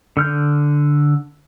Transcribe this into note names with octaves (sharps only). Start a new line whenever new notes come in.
D3 F6 G6